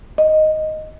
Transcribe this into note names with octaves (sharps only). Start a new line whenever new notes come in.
D#5